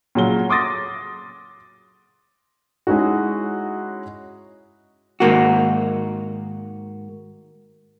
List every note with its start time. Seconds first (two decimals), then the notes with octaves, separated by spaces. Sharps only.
0.15 A#2 C#3 F#3 F#4 G7
0.50 C6 D6 D#6 A6 A#6
2.87 G#3 C#4 D#4 E4 F#4
5.20 G#2 D#3 A#3 F#4